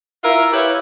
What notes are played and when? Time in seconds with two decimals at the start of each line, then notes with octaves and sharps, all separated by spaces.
0.24 E4 F4 A#4 E5
0.53 E4 G4 B4 C#5 E5